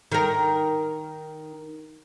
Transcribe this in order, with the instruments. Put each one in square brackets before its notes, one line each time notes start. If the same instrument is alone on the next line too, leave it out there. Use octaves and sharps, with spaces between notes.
[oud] D#3 A#4